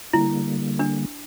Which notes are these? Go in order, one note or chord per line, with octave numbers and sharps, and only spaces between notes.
D3 G3 A#3 E4
D4